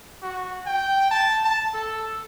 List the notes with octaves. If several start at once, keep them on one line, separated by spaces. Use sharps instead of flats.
F#4
G5
A5
A5
A4